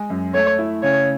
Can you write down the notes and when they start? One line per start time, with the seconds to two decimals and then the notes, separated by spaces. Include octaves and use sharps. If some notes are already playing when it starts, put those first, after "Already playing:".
Already playing: G#3
0.10 F#2
0.34 A3 C#5
0.59 E4
0.83 C#3 C#5